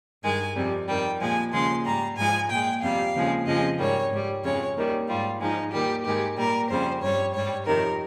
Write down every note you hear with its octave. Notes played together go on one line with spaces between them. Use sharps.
G2 D#3 G#3 G#5
F2 C3 G3
F2 D#3 G3 G5
A#2 F3 G#3 G#5
D#2 C#3 F3 G#3 C6
G#2 G3 A#5
G#2 F3 G#3 G#5
A#2 G#3 G5
F2 C3 G3 F5
D#2 C#3 F3 G#3
F2 C#3 F3 G#3 D#5
G#2 D#3 G3 C#5
G#2 G3
F2 C#3 G#3 C#5
D#2 D#3 G3
G#2 G3 F4
G#2 F3 G#3 D#4
D#2 D#3 G3 G4
G#2 D#3 G#3 G4
A#2 G3 A#4
F2 C#3 G3 C5
G2 G3 C#5
G#2 G3 C#5
F2 C3 D#3 A#4